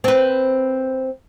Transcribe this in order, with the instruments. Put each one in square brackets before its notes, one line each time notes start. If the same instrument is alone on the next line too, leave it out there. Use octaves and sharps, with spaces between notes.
[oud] C4 B4